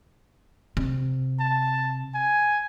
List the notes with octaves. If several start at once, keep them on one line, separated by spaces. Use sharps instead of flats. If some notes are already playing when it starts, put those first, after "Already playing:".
C3
A5
G#5